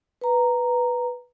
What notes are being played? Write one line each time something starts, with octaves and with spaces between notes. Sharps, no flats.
B4 A#5